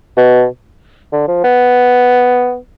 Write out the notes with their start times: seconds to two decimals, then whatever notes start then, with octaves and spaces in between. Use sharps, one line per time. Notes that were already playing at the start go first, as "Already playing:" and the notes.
0.17 B2
1.12 D3
1.28 F3
1.44 B3